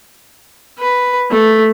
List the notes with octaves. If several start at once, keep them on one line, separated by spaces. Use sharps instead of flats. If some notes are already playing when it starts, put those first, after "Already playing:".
B4
A3